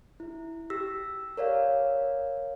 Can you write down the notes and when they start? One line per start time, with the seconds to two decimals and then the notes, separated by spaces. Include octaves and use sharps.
0.20 E4
0.70 G4 E6 A#6 B6
1.37 A#4 C#5 D5 F5